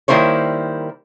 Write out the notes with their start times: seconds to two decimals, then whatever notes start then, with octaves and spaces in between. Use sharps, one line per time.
0.08 D#3 G3 A#3 E4 C5 C#5